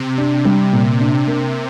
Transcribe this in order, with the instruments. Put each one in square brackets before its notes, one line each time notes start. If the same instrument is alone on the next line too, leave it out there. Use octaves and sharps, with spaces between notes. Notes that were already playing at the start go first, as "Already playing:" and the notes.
Already playing: [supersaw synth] C3
[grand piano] D4
G3
A#2
D4
A#3